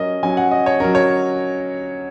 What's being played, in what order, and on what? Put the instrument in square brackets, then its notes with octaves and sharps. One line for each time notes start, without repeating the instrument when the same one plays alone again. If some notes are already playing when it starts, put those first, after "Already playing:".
Already playing: [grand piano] F#3 C#4 A#4 D#5
F#3 C#4 G#5
F#5
D#5
C#5
F#3 C#4 A#4
C#5